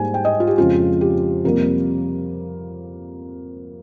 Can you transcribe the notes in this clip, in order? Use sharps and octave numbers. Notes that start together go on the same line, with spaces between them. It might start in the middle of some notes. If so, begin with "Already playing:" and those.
Already playing: G#2 G3 A#3 G#5
G5
D#5
F4
G4
F2 C#3 G#3 F4
G4
F2 C3 G3 A#3 A#4